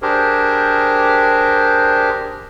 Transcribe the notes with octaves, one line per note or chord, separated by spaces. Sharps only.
D4 G4 G#4 A#4 C5